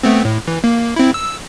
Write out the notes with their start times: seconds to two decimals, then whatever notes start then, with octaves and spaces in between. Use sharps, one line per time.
0.03 A3 B3 C4
0.25 A2
0.48 E3
0.64 A#3
0.96 C4 E4
1.14 E6